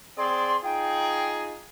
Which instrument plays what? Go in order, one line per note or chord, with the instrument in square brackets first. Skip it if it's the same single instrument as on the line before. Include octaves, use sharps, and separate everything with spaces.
[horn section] C4 G#4 D5 [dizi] C6
[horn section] D#4 F4 G#4 [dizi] G5